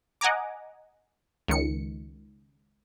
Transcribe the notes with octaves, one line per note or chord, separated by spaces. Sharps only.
D#5 F#5 G#5 A#5 D6
C#2 D#3 C#7